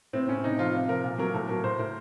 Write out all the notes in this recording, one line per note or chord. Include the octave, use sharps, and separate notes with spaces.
A2 C4
A2 C#4
C3 D#4
F3 F4
C3
F3 A#4
A#2
F#3 A#4
A2 A4
F#3 A#4
A2 C5
A2 A#4